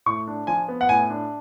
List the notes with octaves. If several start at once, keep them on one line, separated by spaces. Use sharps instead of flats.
A2 C#6
D4
F3 G#5
B3
F#5
A2 G#5
D4